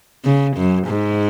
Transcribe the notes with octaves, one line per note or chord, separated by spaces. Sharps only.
C#3
F#2
G#2